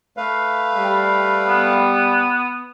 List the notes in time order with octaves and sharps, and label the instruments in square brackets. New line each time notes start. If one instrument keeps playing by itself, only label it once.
[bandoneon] A3 B4 F5
[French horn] G3
[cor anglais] B3